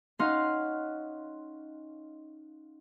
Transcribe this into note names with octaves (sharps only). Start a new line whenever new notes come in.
C#4 D#4 F5 F#5 C6